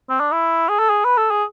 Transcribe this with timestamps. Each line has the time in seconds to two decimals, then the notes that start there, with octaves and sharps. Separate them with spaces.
0.10 C4
0.20 D4
0.32 E4
0.69 G#4
0.79 A4
0.90 G#4
1.04 B4
1.17 A4
1.31 G#4